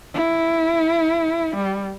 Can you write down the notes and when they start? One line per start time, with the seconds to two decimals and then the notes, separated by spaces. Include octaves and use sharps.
0.14 E4
1.56 G3